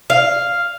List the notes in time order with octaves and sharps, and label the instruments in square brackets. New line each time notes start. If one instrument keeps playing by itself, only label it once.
[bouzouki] F5